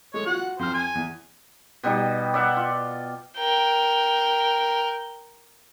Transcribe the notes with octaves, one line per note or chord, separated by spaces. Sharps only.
G#3 A3 C#5
F4 F#4 F#5
F2 C5 F6
G#5
E2
B2 G3 D#4
D5 E5 F#5 G5
F4
A#4 G5